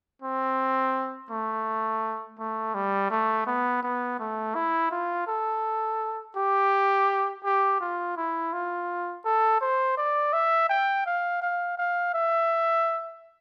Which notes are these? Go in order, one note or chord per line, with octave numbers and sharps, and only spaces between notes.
C4
A3
A3
G3
A3
B3
B3
A3
E4
F4
A4
G4
G4
F4
E4
F4
A4
C5
D5
E5
G5
F5
F5
F5
E5